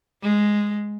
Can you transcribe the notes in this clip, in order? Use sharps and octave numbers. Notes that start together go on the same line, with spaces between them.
G#3